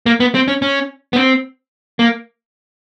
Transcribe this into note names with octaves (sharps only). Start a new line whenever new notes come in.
A#3
B3
C4
C#4
C#4
B3
C4
A#3